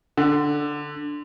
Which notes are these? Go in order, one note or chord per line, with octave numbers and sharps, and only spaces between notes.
D3